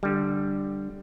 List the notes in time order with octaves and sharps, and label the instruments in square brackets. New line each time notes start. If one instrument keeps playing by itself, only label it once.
[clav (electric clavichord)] D3 G3